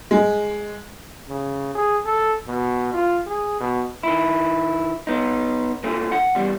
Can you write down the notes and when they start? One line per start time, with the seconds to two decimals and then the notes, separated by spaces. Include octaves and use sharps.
0.11 G#3
1.29 C#3
1.75 G#4
2.05 A4
2.47 B2
2.93 F4
3.27 G#4
3.60 B2
4.03 D#3 E4
5.07 B3 D#4
5.84 A#2 D3 A3
6.12 F#5
6.35 E2 G3